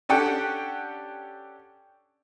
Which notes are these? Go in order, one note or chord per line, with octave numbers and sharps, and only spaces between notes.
C#4 D4 G4 A4 F#5 G5